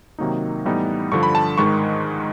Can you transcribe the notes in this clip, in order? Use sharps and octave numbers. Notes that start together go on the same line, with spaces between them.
C3 D#3 F#3 A#3 D#4
A2 E3 G3 B3 D#4
G2 D3 F3 C#6
B5
A5
G#2 D#3 G#3 C#6